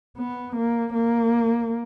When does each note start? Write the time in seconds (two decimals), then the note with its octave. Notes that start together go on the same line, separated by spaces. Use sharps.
0.18 B3
0.56 A#3
0.94 A#3